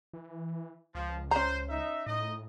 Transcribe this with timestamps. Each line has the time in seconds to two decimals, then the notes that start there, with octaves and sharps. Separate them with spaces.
0.13 E3
0.95 C#2 F3
1.31 C#4 C5 A#5
1.70 D#4 E5
2.07 A2 D#4 D#5